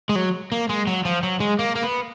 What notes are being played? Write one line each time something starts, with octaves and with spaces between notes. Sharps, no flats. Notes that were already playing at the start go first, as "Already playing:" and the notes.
G#3
F#3
A#3
G#3
F#3
F3
F#3
G#3
A#3
A#3
B3